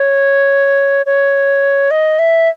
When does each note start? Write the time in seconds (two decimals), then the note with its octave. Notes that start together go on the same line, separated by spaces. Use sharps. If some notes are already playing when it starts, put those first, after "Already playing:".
Already playing: C#5
1.06 C#5
1.91 D#5
2.19 E5